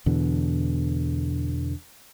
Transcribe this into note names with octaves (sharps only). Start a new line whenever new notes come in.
E2 B2 D3